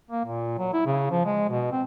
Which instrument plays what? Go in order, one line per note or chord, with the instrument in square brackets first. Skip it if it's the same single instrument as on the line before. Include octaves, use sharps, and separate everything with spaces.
[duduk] A#3
A#2
F#3
E4
C#3
F3
G#3
B2
C4